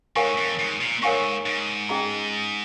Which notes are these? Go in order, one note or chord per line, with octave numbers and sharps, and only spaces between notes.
G#2 A#4 C#5 F5 G#5 C#6
F2
G#2
A#2
G#2 A#4 C#5 F5 G#5 C#6
G#2
C#4 G#4 D#5 A#5